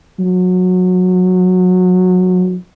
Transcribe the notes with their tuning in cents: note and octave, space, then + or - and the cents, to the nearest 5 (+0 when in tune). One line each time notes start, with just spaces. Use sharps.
F#3 -20